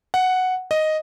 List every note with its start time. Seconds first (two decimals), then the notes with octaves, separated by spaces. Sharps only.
0.14 F#5
0.71 D#5